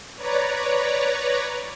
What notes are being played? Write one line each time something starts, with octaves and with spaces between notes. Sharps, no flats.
B4 C#5 D5 A#5